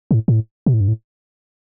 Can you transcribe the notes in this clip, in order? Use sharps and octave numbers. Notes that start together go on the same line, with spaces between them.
B2
A2
A2
B2
A2
G2
A2